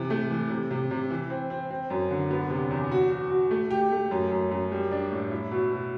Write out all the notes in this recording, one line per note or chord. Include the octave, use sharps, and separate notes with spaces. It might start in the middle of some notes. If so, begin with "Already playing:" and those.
Already playing: C3 E3
A3
E3
C3
C3
C3
E3
C4
C4
C4
F#2
D3
B3
C3
E2
F#4
F#4
F#4
A3
G4
A3
F#2
F#2
F#2
G3
D4
A2
E4
B2
B2